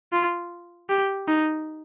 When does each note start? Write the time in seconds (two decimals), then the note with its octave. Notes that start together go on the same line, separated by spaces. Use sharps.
0.12 F4
0.89 G4
1.28 D#4